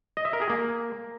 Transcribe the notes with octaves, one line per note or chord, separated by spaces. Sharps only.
D#5
E5
A#4
G#4
A#3